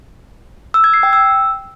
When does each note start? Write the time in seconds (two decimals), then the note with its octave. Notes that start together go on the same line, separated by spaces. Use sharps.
0.74 E6
0.84 G#6
0.94 C7
1.03 G5
1.13 E6